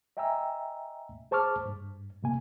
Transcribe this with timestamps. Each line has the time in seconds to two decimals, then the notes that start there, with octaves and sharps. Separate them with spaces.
0.17 D#5 E5 G5 G#5 A#5 E6
1.31 G#4 C5 A5 C#6 D6 F6
1.66 G2
2.23 G2 C3 A#3 G#5